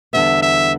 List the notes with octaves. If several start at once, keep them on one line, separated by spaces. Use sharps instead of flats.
E2 D3 G3 B3 E5
E5